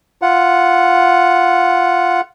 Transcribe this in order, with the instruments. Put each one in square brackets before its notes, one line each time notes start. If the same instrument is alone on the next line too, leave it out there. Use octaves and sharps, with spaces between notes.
[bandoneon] F4 F#5